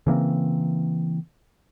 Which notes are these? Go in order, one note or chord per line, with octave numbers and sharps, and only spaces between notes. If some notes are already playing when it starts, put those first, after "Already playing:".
C#3 E3 A#3 C4